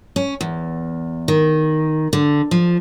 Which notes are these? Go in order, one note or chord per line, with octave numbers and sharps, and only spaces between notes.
C#4
E2
D#3
D3
F3